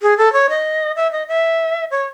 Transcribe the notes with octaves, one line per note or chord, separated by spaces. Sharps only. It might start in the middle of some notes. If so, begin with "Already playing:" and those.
G#4
A4
C#5
D#5
E5
D#5
E5
C#5